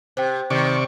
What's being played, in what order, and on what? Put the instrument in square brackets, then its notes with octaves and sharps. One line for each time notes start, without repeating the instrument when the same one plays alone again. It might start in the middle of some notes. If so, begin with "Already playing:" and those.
[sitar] C3 [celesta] C5 G5
[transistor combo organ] C3 D5 C#6 [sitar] D#3